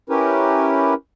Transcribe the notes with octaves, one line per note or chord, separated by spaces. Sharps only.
C#4 E4 G4 A#4 B4